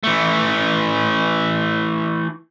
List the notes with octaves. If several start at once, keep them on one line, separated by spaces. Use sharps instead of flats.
E3 A3